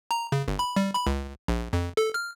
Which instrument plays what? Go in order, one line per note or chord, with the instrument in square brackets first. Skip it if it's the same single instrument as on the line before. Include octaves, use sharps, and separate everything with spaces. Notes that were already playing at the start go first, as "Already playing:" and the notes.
[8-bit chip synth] A#5
C#3
G1
B5
G3
B5
C#2
A#1
F2
A4
F6